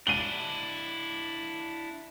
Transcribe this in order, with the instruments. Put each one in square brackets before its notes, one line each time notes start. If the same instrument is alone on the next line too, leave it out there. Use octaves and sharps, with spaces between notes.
[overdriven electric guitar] D4 E4 [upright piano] D#7 G7